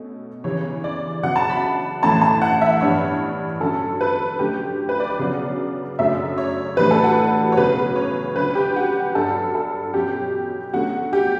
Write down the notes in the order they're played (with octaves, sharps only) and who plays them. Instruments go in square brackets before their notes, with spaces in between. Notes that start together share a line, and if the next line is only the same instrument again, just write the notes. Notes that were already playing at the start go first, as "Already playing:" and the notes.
Already playing: [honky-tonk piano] B2 A3 C#4
E2 C#3 E3 G3 C#5
D5
C#3 F#3 B3 F#5
A5
B5
A2 E3 A3 C#4 A5
A5
F#5
E5
G2 E3 B3 D4 C#5
D3 F#3 C#4 A4
B4
D3 F#3 A3 C#4 G4
B4
D5
D5
E2 C#3 F#3 B3
F#2 C#3 F#3 A3 D4 E5
C#5
A2 E3 G3 D4 B4
A4
F#4
C#5
E2 C#3 F#3 B4
C#5
D3 F#3 C#4 B4
G4
F#4
G2 F#3 B3 D4 A4
A4
E2 B2 F#3 C#4 G4
E2 D3 A3 C#4 F#4
G4